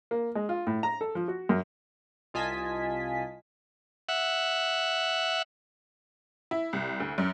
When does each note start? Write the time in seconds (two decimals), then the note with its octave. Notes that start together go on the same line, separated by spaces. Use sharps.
0.11 A#3
0.35 G#3
0.49 F4
0.67 A2
0.83 A#5
1.01 A4
1.15 F3
1.28 F#4
1.49 F#2
2.34 C2 F4 D#5 G#5 A5 B6
4.09 E5 F#5
6.51 E4
6.73 C2
7.00 D2
7.18 F#2